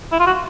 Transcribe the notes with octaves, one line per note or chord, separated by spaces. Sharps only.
E4
F4
F#4